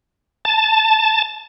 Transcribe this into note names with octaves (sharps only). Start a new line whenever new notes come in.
A5